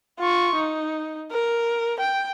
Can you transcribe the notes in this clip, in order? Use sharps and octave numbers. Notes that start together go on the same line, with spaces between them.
F4 C#6
D#4
A#4
G5